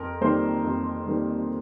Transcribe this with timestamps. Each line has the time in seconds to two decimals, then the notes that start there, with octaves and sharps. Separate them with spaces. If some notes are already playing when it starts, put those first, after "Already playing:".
Already playing: F2 A#4
0.21 D#3 G3 A#3 C5
0.64 F2
1.07 D#3 G3 A#3